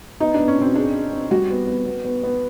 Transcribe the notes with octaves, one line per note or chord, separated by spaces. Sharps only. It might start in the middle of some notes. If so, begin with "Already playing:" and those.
B3 D#4
B3 D4
C#4
B2 C4
D4 G#4
G#4
C4
G3 F#4
B3
B3
B3
B3
B3